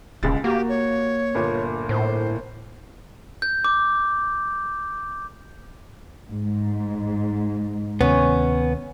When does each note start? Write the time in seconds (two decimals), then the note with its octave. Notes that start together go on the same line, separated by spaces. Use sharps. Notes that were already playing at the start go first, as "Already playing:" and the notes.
0.23 D#1 C#2 G#3 A6
0.44 A#3 F#4 G4
0.69 C#5
1.35 G1 A#2 F4
1.89 A2 C5
3.42 G6
3.64 D6
6.29 G#2
8.01 D2 C3 D#3 B3 C#4